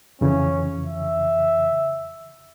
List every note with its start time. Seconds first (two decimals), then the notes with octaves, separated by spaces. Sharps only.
0.21 F2 C#3 E3 C#4
0.86 E5